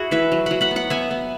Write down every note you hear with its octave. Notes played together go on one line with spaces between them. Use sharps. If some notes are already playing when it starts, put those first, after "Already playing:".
Already playing: E4 F#4 G#4
E3 B4 E5
F#3
F#3 F#5 B5
F#5 B5
B3
F#5 B5
B3 E5 G#5
B3